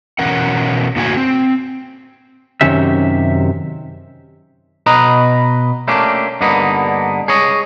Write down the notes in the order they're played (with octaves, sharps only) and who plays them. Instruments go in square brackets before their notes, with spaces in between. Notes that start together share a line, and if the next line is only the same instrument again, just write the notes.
[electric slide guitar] B2 E3 C#4 A#4 F#5
A2 D3 A#3 F#4 E5 G#5
C4
F#2 C3 D#3 C#4 G4 E5
[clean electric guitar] B2 B4 D#5 A#5
A3 A#3 C#4 D4 F4 G4
G2 D3 A#3 B3 D#4
G#4 C#5 D#5